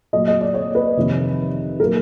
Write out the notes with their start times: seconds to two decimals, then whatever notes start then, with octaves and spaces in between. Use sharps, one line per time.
0.13 A#2 F#3 A3 D#5
0.27 D#5
0.41 D5
0.54 C#5
0.75 B4
0.97 F2 C3 D#3
1.80 A#2 F#3 A#3 A#4